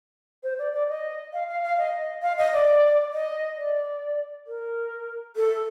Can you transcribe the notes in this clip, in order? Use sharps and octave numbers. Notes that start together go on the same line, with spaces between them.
C5
D5
D5
D#5
F5
F5
F5
D#5
F5
D#5
D5
D#5
D5
A#4
A4